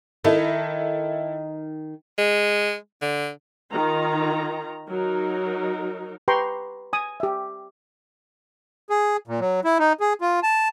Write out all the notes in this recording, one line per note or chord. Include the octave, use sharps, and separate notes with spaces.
D#3 E4 A4
G#3
D3
D#3 F4 A#5
F#3 D#4 A#4
G4 B4 G5 A#5 C6 C#6
G#5 D#6
G4 E5
G#4
A#2
F#3
E4
D#4
G#4
F4
A5